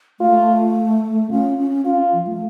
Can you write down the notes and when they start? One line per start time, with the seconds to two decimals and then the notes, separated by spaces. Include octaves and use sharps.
0.20 A3 F4
1.31 C#4 F4
1.58 C#4
1.85 C#4 F4
2.13 F3
2.27 A3